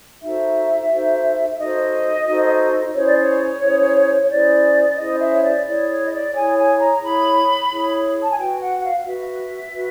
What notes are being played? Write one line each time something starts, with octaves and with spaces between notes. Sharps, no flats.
D#4 F#4 A4 C5 E5
D#4 F#4 A4 C5
E5
D#4 F#4 A4 C5 D#5
D#4 F#4 A4 C5
C#4 E4 G#4 C5 C#5
D5
C#5
C#4 E4 G#4 C5
C#5
C#4 E4 G#4 C5 D5
C#4 E4 G#4 C5 D#5
E5
C#5
D5
E4 G#4 C#5 D5
C#5
D#5
D5
E4 G#4 C#5 G#5
G#5
A#5
E4 G#4 C#5 B5
E4 G#4 C#5
A5
G#5
F#4 B4 G5
F#5
F5
F5
F#4 B4 E5
F#4 B4